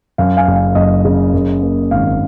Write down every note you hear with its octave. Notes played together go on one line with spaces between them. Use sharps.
F#2 F5
F5 G#5
F#1
F5
F#1 D#5
C#3
F#2
A#3
G#1 F5